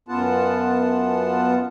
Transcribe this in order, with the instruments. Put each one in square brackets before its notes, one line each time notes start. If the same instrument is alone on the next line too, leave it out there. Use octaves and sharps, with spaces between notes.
[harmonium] F#2 B3 F4 F#5 A5